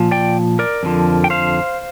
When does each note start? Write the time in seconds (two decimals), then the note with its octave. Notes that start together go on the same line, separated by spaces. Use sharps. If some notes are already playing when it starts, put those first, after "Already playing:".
Already playing: A#2 F3
0.11 D5 G5
0.59 A#4 D5
0.83 F2 D3 F3
1.24 G5
1.30 C5 F5